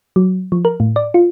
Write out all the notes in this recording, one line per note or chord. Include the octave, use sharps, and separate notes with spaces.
F#3
F3
A#4
A2
D5
F4